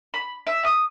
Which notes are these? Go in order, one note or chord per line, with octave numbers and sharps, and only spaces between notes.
B5
E5
D#6